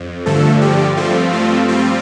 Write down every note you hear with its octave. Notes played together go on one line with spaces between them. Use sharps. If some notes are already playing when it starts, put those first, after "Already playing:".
Already playing: F2
G2 D3 F3 A3 A4
G3 G4
G2 F3 A3 C4 F4
F4
G3 C4 F4